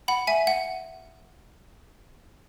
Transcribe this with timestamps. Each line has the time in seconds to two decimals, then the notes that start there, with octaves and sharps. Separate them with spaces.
0.08 F#5 B5
0.27 E5 G#5
0.47 F#5